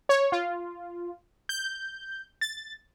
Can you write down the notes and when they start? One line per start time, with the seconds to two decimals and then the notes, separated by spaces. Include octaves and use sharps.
0.09 C#5
0.32 F4
1.49 G6
2.41 A6